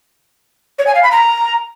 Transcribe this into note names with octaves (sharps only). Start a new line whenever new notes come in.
C#5
G#5
F5
B5
A#5